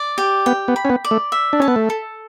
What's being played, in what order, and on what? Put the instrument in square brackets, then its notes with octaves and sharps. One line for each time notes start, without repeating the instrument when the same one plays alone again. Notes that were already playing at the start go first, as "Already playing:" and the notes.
Already playing: [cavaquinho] D5
G4
[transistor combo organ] B3 [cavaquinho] G5
[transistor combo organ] B3
[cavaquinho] B5
[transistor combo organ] C#4
B3
[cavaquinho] D5
[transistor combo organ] A3
[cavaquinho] E5
[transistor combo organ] D4
[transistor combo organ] C#4 [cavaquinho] A5
[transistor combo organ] B3
A3
[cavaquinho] A4